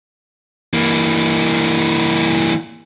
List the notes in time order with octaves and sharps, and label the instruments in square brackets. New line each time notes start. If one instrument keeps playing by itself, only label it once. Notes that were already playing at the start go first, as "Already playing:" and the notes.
[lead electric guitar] E3 A#3